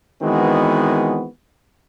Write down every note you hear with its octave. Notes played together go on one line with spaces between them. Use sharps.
D#3 E3 G#3 B3 C4 F#4